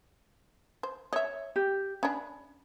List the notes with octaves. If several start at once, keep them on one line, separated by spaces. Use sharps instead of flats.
C5
C#5 D#5 E5
G4
C#4 D4 B5